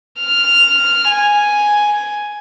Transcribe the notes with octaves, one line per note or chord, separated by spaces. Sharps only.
F6
G#5